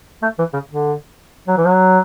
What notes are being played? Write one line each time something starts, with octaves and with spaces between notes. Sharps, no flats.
A3
E3
C#3
D3
F#3
E3
F#3